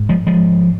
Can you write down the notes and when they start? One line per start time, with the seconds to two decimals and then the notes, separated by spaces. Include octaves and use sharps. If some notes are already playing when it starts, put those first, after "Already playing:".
Already playing: G#2
0.09 F3 G#3
0.27 F3 G#3